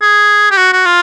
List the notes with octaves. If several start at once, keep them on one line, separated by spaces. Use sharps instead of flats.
G#4
G4
F#4
F#4
F4